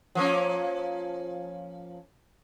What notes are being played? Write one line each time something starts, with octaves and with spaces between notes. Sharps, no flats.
F3 A#3 C#4